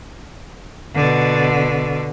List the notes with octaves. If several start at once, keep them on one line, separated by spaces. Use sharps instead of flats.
B2 D3